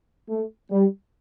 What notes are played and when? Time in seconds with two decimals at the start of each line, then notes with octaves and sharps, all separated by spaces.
0.29 A3
0.71 G3